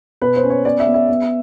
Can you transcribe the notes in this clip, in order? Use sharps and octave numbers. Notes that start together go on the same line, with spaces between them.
B2 B4
C5
C#4
C#5
B3 D5
E5
B3
E5
B3